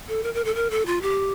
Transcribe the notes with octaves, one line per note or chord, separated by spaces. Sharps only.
A4
A#4
A#4
A4
A#4
A4
F4
G4